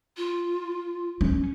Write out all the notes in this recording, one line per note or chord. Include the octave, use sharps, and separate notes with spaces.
F4
C#4